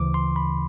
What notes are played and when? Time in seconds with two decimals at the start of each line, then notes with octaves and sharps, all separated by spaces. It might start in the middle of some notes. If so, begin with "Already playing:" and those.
Already playing: D2 C#3 E3 D6
0.14 C6
0.36 B5